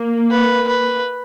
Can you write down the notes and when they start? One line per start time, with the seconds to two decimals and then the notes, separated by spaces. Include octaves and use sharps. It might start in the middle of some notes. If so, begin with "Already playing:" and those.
Already playing: A#3
0.31 B4
0.68 B4